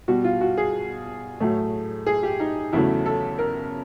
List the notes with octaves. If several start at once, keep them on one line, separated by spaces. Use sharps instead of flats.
B2 G3 F#4
F4
F#4
G#4
A2 F#3 A3
G#4
G4
D#4
E2 C#3 F#3 A3 E4
A4
A#4